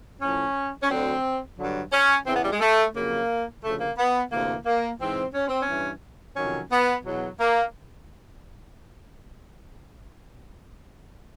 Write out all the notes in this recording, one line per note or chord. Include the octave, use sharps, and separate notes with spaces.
A2 F3 C#4
C#4
D2 D3 F#3 C4
G2 D3 F#3
C#4
E2 C#3 E3 C4
B3
G3
G#3
A3
F2 C#3 F#3 A#3
D2 C#3 F3 A3
A#3
B3
D2 C3 E3 A#3
A#3
G#2 E3 C4
C#4
C4
C#4
G2 E3
F2 C3 D#3 F#3 C#4
B3
E2 B2 F#3
A#3